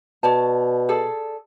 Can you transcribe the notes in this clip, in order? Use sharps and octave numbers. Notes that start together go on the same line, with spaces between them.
B2 C#5 D5 A5
G#4 A4 D5